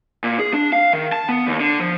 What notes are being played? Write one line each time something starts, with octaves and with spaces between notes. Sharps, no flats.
A#2
G#4
D4
F5
D#3
A5
B3
D#2
D3
F3